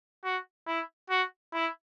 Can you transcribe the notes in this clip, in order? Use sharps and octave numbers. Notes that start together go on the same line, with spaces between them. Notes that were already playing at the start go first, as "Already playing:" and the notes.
F#4
E4
F#4
E4